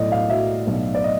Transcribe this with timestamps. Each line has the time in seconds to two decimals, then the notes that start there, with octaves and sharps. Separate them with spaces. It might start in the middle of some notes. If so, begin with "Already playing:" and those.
Already playing: B1 A2 D5 D#5
0.12 F5
0.30 F#3 E5
0.67 B1
0.95 D5
1.04 D#5